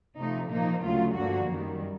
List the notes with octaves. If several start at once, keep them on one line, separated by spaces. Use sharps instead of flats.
C3 F3 A3 D#4
A#2 F3 A#3 D#4
D2 C#3 F#3 A3 F4
G2 D3 F3 A#3 F#4
F#2 D#3 G3